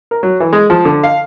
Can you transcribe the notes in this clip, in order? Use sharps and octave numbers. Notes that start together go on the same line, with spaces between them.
A#4
F#3
E3
G#3
F3
D3
F5